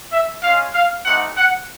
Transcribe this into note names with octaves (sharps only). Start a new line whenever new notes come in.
E5
G#3 C#4 F4 F5
F5
A3 C4 D#4 G4 F#5
F#5